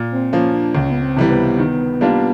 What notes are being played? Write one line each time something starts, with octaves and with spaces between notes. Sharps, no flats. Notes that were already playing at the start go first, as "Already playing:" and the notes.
Already playing: A#2
C4
F3 A#3 C#4
D4
C#2 C#4
B3
C4
C3 E3 G3
B3
D#3
G3 A#3 D4 F4